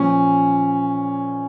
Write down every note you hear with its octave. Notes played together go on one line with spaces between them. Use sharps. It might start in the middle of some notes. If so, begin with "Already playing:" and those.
Already playing: A#2 F3 C#4